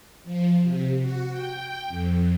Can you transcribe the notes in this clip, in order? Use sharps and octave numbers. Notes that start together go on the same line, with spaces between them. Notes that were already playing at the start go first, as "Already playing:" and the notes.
F3
C3
F#4
G5
F2